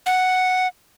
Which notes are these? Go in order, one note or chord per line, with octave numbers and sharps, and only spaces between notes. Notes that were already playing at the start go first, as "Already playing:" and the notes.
F#5